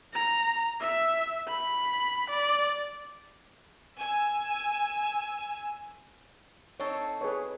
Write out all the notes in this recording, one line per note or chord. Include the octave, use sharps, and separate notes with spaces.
A#5
E5
B5
D5
G#5 E6
C4 D#4 A4 C#5
G#4 B4 C#5